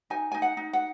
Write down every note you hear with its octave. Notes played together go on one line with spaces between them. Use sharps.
D#4 G#5
D#4 G#5
F#5
D#4
F#5